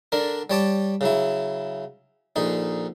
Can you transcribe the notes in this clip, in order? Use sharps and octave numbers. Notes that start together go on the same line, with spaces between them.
D3 D4 A#4
G3 C#5 A5 D6
C#3 F#3 E4
A#1 D3 D#4